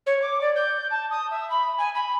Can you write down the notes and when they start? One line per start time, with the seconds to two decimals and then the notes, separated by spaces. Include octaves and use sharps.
0.06 C#5
0.22 D6
0.41 D5
0.55 G6
0.90 A5
1.10 D#6
1.30 E5
1.50 B5
1.78 G#5
1.94 B5